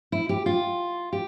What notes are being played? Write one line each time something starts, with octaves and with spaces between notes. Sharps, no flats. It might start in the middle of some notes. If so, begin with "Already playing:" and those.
E4
G4
F4
G4